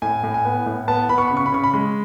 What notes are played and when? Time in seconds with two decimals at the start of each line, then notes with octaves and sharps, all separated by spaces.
0.02 A2 G#5
0.24 A2
0.34 G#5
0.45 B3
0.66 A2
0.88 B3 A5
1.09 B3 B5
1.18 C#6
1.27 C#3 B5
1.37 C#6
1.46 B5
1.52 C#3 C#6
1.64 B5
1.73 G#3